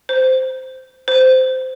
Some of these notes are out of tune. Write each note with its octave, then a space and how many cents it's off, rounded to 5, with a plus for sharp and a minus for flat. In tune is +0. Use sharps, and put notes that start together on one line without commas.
C5 -10
C5 -15